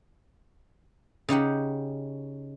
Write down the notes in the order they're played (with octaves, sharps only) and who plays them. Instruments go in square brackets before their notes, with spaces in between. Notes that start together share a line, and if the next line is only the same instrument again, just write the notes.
[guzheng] C#3 D#4 G4 F#5